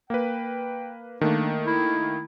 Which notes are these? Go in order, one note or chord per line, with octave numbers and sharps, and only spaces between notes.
A#3 B4 G5
D#3 A3 A#3 D4
E4